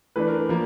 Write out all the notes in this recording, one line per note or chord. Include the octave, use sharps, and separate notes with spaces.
E3 A3 D4 B4
A#4
F3 A#3 A#4